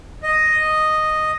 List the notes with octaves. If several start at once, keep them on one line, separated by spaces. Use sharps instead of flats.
D#5